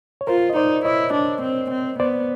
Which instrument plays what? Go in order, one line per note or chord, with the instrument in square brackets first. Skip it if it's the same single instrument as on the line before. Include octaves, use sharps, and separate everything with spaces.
[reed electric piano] C#5
[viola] F4 [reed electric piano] A#4 C5
[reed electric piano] D#5
[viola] D#4 [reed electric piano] C5 D5
[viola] E4 [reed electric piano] C#5 D#5
[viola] D4
C4
C4
[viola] B3 [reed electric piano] C5 D5